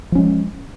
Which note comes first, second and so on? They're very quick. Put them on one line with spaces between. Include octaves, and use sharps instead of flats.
F3 C#4 G#3